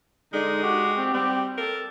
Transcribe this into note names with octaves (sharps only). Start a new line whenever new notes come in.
D3 G#3 D#4
F#4 G4
C4
G3 C4
A4 A#4